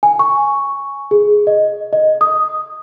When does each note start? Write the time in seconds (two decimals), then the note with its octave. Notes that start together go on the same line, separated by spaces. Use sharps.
0.03 G#5
0.19 C#6
1.11 G#4
1.47 D#5
1.93 D#5
2.21 D#6